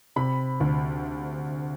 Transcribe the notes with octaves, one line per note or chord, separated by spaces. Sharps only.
C3 B5
D2